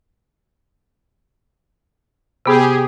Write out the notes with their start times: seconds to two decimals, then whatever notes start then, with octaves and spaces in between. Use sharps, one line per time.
2.46 C3 B3 G4 G#4